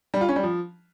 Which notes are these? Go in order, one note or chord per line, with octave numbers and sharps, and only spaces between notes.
G3
F4
C#4
G3
F3